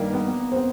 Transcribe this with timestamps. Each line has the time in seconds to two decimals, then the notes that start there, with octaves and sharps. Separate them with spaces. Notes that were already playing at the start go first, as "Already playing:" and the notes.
Already playing: G2 D#3 G3 A#3
0.14 B3
0.52 C4
0.56 B3